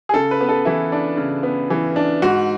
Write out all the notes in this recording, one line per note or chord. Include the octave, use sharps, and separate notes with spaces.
G#4
C#3 A4
B4
B3
A4
E3 E4
D4
C#3
B3
E3
D4
G#2 F#4